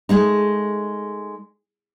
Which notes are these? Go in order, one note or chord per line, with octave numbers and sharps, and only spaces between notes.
G#3 A3 D#4